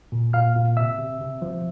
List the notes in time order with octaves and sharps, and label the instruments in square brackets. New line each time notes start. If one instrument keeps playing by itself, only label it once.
[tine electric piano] A#2
A#2 F5 F6
A#2
C3 E5 E6
C3
C3
F3